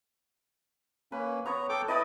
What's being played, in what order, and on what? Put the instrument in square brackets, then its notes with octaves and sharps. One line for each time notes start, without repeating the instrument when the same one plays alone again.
[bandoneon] A#3 C#4 [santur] B4
[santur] B3 C#5 [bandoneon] A#5
[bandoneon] A4 G5 D6
[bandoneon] E4 B4 [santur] D#5 A5 D#6